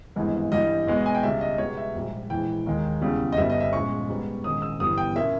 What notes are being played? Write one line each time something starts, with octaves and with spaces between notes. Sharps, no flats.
G#1 G2 E3 G#3 B3
G2 E3 G3 D#5
B1 B2 G#3 B3
G#5
G5
C#2 C#3 G3 E5
D#5
C#2 B2 G3 B3 C#5
E5
A#1 G#2 G3
A#1 G#2 E3 G5
D#2 D#3 G#3
E2 C#3 G3
D#5
G1 G2 G3 B3 E5
D#5
E5
A#1 A#2 G#3 C#4 C#6
G#2 G3 B3
A#1 G#2 D#3 G#3 C#4 D#6
E6
G1 G2 E3 G3 B3 D#6
G5
A#2 A#3 C#4 E5